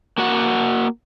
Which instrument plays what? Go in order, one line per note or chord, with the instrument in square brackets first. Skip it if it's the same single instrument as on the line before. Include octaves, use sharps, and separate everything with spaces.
[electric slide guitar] A#3 F#4 F#5